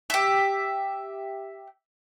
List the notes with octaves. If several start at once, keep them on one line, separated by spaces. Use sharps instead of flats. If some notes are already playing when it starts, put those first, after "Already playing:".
G4 E5